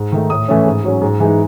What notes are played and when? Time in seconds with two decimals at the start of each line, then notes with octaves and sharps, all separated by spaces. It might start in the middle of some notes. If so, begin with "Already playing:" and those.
Already playing: G#2
0.12 D#3 A3 D#4
0.30 A2 D#6
0.48 E3 A3 C#4
0.66 G#2
0.84 F#3 C#4
1.01 G#2
1.20 E3 G#3 D#4